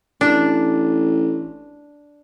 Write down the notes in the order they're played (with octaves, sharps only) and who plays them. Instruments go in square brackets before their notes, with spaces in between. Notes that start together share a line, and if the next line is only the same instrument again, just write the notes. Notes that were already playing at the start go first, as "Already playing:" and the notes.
[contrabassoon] A1 [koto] D4